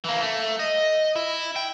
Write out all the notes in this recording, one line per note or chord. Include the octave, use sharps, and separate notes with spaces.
E3 A#3
A3
D#5
E4
G5